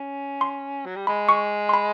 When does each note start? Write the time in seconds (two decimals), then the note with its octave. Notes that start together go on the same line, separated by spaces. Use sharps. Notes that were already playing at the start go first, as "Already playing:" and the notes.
Already playing: C#4
0.41 C6
0.86 F#3
0.96 G3
1.07 G#3 B5
1.29 C#6
1.69 C6
1.74 B5